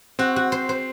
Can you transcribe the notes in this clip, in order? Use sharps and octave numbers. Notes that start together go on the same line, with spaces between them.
C4 F#4
F#4
C5
C5